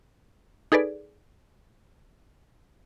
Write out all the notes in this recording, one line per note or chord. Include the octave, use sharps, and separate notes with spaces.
D#4 G#4 A4 B4 D5